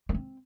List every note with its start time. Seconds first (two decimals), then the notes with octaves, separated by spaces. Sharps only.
0.09 A#3
0.15 C4